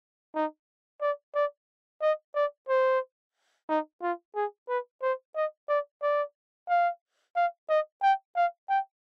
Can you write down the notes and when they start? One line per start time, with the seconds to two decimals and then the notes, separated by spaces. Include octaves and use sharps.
0.35 D#4
1.01 D5
1.35 D5
2.02 D#5
2.35 D5
2.69 C5
3.69 D#4
4.02 F4
4.35 G#4
4.69 B4
5.02 C5
5.36 D#5
5.69 D5
6.02 D5
6.69 F5
7.36 F5
7.70 D#5
8.03 G5
8.36 F5
8.69 G5